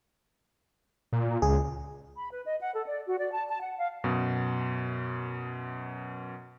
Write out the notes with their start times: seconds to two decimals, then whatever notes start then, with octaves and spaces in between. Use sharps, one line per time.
1.13 A#2
1.42 C#2 G#4
2.17 B5
2.30 B4
2.45 D#5
2.61 F#5
2.74 A4
2.86 D5
3.06 F#4
3.18 D5
3.32 A5
3.48 A5
3.61 F#5
3.77 F5
4.04 F#2 B2